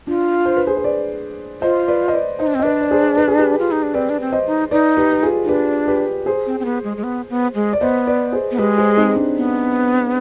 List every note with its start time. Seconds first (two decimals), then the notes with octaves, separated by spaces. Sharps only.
0.07 D4 F4
0.46 C5
0.56 B4
0.67 G#4 C5
0.77 C5
0.84 B4 D5
1.61 F4 C5 D#5
1.88 B4 D5
2.08 D#5
2.14 B4 D5
2.39 D#4 C5 D#5
2.47 D4
2.55 C4
2.60 D#5
2.63 D4 B4 D5
2.81 D5
2.91 G#4 C5
3.17 B4
3.28 G#4
3.39 G4 B4
3.59 F4
3.71 D#4
3.83 D4
3.94 C4 B4 D5
4.10 D4
4.21 C4
4.32 C5 D#5
4.46 D#4
4.71 D#4 B4 D5
4.97 G4 B4
5.12 B4
5.23 F4 G#4
5.44 D#4
5.49 D4 G4 B4
5.88 G4 B4
6.26 G#4 C5
6.46 C4
6.60 C4
6.65 B3
6.84 G#3
6.97 G#3
7.03 B3
7.30 B3
7.55 G#3
7.73 D5
7.81 B3 C5 D#5
8.07 B4 D5
8.32 G#4 C5
8.51 B3
8.58 G#3 G4 B4
8.78 G#4 C5
8.97 C4 D#4
9.16 D4
9.36 B3